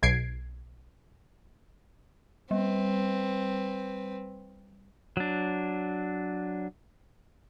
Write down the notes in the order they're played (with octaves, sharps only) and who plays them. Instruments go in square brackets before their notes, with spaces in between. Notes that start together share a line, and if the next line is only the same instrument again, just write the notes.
[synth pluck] B1 G#6 C7 D7
[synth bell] G3 [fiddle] C4 B4
[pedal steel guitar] F#3 D4